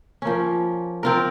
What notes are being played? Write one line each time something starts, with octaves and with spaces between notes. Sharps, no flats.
F3 A#3 C#4
C4 F4 A#4